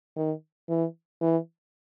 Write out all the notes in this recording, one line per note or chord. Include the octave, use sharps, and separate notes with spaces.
D#3
E3
E3